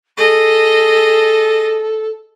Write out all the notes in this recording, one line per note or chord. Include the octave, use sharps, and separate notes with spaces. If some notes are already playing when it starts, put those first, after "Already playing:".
G#4 A4 D#5